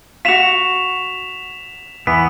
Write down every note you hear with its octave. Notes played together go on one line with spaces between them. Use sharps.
F4 F#4 B6 E7 F7
E3 B3 B6